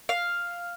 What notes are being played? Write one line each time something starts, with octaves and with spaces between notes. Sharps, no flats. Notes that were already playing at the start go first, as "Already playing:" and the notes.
F5